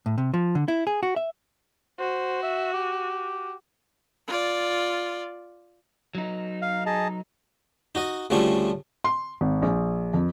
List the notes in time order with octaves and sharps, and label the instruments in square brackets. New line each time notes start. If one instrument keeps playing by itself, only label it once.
[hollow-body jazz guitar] A2
C3
F3
D3
E4
G#4
F#4
E5
[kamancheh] F#4 [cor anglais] C5
[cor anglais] E5
G4
[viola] F4 D5
[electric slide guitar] F#3 D#4
[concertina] F5
G#4 D#5 A5
[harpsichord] D#4 F#4 D#5
D2 C#3 F3 G3 A3 C#6
[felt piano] C6
G#1
A#1
F2